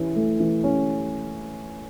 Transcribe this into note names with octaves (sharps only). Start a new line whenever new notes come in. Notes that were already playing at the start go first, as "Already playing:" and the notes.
Already playing: E3 C#4 E4
A3
E3
C#4